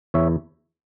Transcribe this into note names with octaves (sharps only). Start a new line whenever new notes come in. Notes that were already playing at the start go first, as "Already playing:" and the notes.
E2 C#5 E5